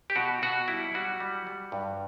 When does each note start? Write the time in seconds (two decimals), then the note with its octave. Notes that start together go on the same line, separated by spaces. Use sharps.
0.10 G4
0.16 B2 F#4
0.42 B2 F#4
0.68 G3 E4
0.94 G3 F#4
1.20 G3
1.47 G3
1.72 G2